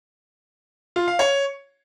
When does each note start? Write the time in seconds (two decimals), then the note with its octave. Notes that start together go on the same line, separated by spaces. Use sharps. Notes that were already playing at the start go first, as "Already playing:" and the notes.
0.96 F4
1.08 F5
1.19 C#5